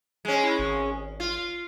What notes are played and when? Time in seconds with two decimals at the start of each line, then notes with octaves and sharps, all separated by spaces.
0.25 G#3 C#4
0.44 E4
0.59 G#1
1.20 F4